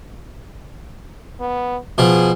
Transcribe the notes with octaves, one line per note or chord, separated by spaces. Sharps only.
B3
B2 F3 G#4